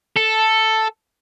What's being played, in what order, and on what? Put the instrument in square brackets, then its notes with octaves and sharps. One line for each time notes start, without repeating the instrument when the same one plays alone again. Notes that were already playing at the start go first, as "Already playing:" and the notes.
[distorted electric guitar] A4